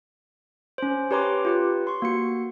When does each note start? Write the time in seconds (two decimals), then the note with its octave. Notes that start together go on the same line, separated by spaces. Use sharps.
0.78 C#4 C5
1.11 G4 B4 C#5 A#5 C6 D6
1.45 F4 G4 B4
1.87 C6 C#6
2.02 A#3 F#4 C#7